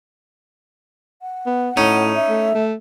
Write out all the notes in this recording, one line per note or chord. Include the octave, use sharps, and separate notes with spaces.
F#5
B3
A2 C#4 D#4
E5
A3
A3